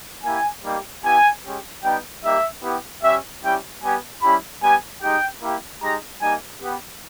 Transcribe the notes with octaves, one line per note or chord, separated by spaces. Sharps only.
A#3 E4 G4 G#5
G3 A#3 D#4 G4
B3 E4 G4 G#5
G#3 C#4 G4
G3 B3 D#4 G5
G3 A#3 D#4 G4 E5
B3 E4 G4
G3 C#4 G4 E5
G3 C#4 E4 G4 G5
G3 B3 G4 G#5
G3 C#4 E4 G4 B5
G3 B3 G4 G#5
G#3 D#4 G4 G5
A#3 E4 G4
G#3 D#4 G4 A#5
G3 A#3 D#4 G4 G#5
B3 G4